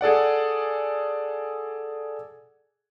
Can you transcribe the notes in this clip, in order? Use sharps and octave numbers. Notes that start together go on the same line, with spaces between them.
G#4 A4 D5 F#5